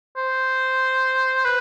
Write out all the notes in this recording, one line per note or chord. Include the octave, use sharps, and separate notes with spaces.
C5
B4